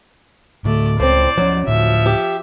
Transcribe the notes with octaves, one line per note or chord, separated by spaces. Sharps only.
A2 D3 A3 D5
C#2 A2 C4 C5 D5
F3 F#3 C4 C#4
D2 A2 F3 E5
G4